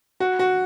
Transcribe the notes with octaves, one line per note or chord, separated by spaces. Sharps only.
F#4
F#4